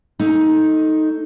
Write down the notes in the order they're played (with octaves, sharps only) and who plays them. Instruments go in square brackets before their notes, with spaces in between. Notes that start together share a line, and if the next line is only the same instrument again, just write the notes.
[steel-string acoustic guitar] A3 D#4